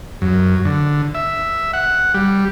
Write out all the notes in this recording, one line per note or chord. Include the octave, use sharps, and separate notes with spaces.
F#2
D3
E5
F#5
G3